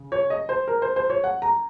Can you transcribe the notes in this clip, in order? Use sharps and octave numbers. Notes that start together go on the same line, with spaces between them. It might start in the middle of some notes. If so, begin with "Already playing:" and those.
Already playing: C#3
C#5
D#5
C5
A#4
C5
C5
C#5
F#5
A#5